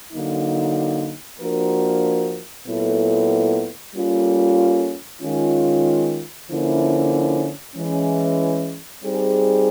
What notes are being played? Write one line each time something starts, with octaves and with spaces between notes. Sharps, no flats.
D3 F#3 A#3 D#4
F3 A#3 D4 F#4 A#4
A#2 F#3 B3 E4 A4
G3 A#3 C#4 F4 A4
D#3 G#3 C#4 F4
D3 F3 A#3 C#4 E4
E3 G#3 C#4
G3 C4 D#4 G#4